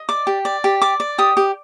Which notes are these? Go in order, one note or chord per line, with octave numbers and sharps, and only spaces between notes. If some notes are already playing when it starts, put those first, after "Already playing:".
Already playing: D#5
D5 D6
G4
D5
G4
D5 D6
D5
G4 D#6
G4